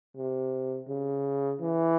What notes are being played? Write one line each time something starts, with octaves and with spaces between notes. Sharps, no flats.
C3
C#3
E3